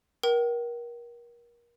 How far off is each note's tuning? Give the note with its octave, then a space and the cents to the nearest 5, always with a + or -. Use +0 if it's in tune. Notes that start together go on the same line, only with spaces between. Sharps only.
A#4 +30 G5 -40